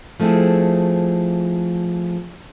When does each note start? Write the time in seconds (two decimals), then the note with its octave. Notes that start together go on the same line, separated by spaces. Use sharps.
0.20 F3 A3 C4 E4 G#4